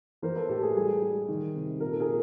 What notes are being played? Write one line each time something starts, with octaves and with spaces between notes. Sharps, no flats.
E3 A#4 C5
A4 B4
A2 G4 A4
G#4
G3 G#4
G3
D#3
C3
A#2 A#4
A4
G#4 A#4
A#2